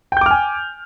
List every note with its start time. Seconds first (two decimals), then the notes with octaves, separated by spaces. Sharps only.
0.12 G5
0.17 G6
0.21 D6
0.26 F6
0.31 G#5